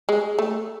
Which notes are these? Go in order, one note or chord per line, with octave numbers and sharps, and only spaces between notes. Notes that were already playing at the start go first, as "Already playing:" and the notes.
G#3
A3